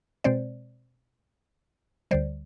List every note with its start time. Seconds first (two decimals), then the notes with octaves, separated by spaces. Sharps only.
0.24 B2 G#3 C4 C5 D5
2.11 D2 D3 G3 C5 D5